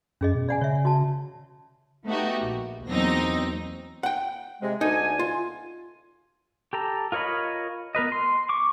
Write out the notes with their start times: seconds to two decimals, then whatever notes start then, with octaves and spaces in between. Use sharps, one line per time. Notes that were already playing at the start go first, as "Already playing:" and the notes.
0.21 F#2 C#4 G#4 D#5
0.35 B2
0.49 D5 F#5 G#5
0.61 C#3 C#5 E5
0.85 F#4 A5
2.06 A3 B3 D#4 F#4 G4
2.45 A#1
2.87 E2 F#3 A#3 C4 D#4 A#6
4.03 F#5 G5
4.62 C3 G#3
4.81 D2 D3 D#4 G#5
5.19 F4
6.73 G4 A4 A#5
7.12 F4 A#4 C#5 D#5 B5
7.95 B3 A#4 B4 D#5
8.12 C6
8.49 C#6 D6